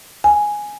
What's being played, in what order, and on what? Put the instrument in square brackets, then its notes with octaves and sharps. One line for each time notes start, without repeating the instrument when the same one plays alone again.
[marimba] G#5